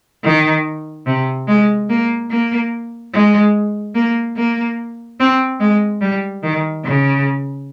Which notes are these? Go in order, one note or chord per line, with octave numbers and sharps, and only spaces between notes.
D#3
C3
G#3
A#3
A#3
G#3
A#3
A#3
C4
G#3
G3
D#3
C#3